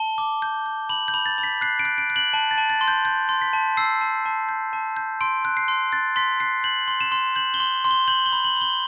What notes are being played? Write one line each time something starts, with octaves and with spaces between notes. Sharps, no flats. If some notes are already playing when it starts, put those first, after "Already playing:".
Already playing: A5 G7
D6
G6
G6
B5 F#7
G6
B5
A6
B5
B6
F#6 C7
D7
F#6
D7
F#6
F#7
A5
A6
A5
A6
C6
G6
G6
C6
B6
A5
E6 C7
A5
A5
G6
A5
G6
C6 D7
F#6
C7
C6
F#6 A6
C6 B6
F#6 C7
G6 F#7
C6
E7
C6
G6 F#7
G7
C6
C6
G7
G6 F#7
G7
B5
F#7
B5
G7